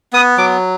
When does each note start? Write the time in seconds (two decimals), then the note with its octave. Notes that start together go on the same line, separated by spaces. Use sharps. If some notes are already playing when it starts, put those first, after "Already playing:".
0.13 B3 D#6
0.38 F#3 D6